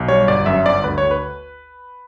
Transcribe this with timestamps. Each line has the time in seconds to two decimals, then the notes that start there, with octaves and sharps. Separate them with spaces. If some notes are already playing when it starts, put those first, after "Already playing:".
Already playing: B1
0.08 G3 C#5
0.28 G1 D5
0.46 F#2 E5
0.65 G1 D5
0.84 D2 B4
0.98 C#5
1.03 D2
1.11 B4